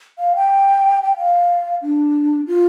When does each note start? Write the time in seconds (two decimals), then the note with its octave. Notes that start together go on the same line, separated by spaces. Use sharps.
0.19 F5
0.36 G5
1.03 G5
1.17 F5
1.82 D4
2.48 F4